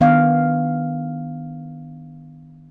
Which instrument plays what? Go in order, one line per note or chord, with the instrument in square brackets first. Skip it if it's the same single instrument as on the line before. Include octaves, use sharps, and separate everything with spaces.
[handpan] D#3 B3 D4 F5